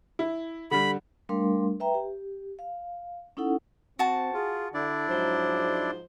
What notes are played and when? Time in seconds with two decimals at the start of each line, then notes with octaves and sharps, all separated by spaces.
0.19 E4
0.71 D3 G3 B5
1.29 G3 A3 D4 A#4 F5 C6
1.80 B4 E5 G5 A#5
1.94 G4
2.59 F5
3.37 C#4 D#4 E4 A4 F#5
3.99 C4 F#4 A5
4.34 F4 G#4
4.74 D3 D4 E4 D5
5.09 G#2 F3 F#3 D#4 C5